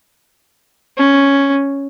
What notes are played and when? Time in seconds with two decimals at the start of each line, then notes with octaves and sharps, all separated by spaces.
0.97 C#4